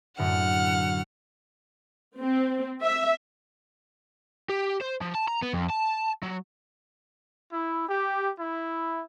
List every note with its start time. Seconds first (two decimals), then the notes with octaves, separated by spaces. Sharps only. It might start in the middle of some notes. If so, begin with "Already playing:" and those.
0.18 F#2 A2 D3 F#5 F6
2.18 C4
2.84 E5
4.50 G4
4.82 C5
5.02 F3
5.15 A5
5.28 A#5
5.42 B3
5.54 F2
5.70 A5
6.23 F#3
7.53 E4
7.89 G4
8.40 E4